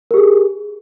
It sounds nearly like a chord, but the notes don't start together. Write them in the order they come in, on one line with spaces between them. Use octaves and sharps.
A#4 G4 G#4